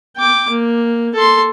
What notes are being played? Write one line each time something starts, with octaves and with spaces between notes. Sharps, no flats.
G5 D6
A#3
A4 C6